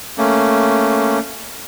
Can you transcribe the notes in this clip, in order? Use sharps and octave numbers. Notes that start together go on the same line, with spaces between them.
A3 A#3 C#4